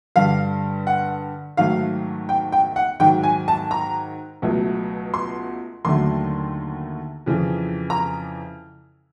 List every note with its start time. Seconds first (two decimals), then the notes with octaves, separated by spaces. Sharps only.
0.16 G2 D3 G3 F5
0.87 F#5
1.57 G#2 D#3 F#3 A3 F5
2.29 G5
2.52 G5
2.76 F#5
3.00 G#2 D#3 F#3 G5
3.23 G#5
3.48 A5
3.71 A#5
4.42 C#2 B2 F#3 A3
5.14 C6
5.85 D#2 D3 F#3 A3 C6
7.26 F2 C#3 E3
7.90 A#5